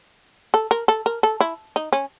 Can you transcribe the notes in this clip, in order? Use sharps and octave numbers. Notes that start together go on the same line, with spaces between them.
A4
A#4
A4
A#4
A4
E4
D#4
C#4